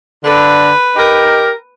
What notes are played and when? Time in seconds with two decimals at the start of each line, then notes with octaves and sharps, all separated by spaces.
0.24 D3 B4
0.96 D#4 G4 A#4